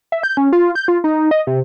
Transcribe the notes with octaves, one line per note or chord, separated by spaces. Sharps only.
E5
G6
C#4
F4
G6
F4
D#4
D#5
C3